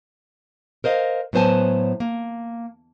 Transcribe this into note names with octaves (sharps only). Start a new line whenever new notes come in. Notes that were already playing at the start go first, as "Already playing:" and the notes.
A#4 C5 D#5 F5
A2 F#3 B3 C5 G#5 A5
A#3